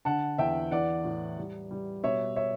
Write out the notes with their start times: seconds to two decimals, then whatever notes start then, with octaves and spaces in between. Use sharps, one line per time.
0.05 D3 F#5 A5
0.38 E2 E5 G5
0.71 E3 D5 F#5
1.04 A2
1.38 G3
1.71 G3
2.04 B2 C#5 E5
2.36 C#5 E5